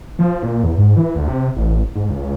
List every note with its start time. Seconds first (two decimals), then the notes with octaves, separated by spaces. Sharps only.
0.19 F3
0.43 A#2
0.63 E2
0.77 G#2
0.96 E3
1.15 D2
1.28 C3
1.57 A1
1.95 G#2
2.09 C#2